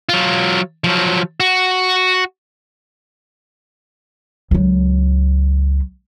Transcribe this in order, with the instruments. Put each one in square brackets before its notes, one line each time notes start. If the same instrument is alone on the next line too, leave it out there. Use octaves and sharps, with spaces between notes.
[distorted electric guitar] F#3 F4
F3 F#3
F#4
[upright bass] C#2 F#3